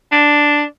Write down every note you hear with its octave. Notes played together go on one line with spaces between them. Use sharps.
D4